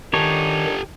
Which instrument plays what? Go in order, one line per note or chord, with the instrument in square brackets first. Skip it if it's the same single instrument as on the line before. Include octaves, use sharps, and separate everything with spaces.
[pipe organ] D#3 [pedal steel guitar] D4 D#4 C#5 [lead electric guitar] G4 A4